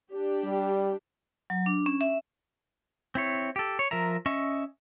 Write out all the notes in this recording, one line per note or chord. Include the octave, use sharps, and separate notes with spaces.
D4 G4
G3
F#3
D4
C#4
E5
C4 E4 C#5
G4 A4
C#5
F3 A#4 E5 A#5
C#4 D#5 E5 C#6